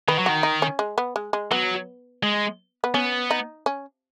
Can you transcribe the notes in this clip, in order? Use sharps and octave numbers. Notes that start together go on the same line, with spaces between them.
D#3 B4
F#3
D#3 F#4
D#4
C#4
G#3
B3
G#3
G#3
F#3 B3
G#3
B3
B3 C#4
D#4
C#4